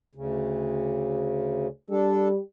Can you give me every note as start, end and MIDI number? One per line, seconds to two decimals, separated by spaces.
0.15 1.67 38
0.15 1.67 49
1.90 2.39 55
1.90 2.28 62
1.90 2.28 69